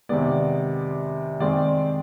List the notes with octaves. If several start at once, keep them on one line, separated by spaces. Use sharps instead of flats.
C3 D#3 G#3 B3 D5
D#3 G#3 C4 D5